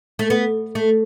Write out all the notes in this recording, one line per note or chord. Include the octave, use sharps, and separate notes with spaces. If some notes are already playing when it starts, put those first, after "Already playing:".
A3
B3
A3